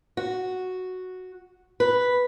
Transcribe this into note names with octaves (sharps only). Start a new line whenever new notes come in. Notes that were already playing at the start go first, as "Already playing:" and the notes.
F#4
B4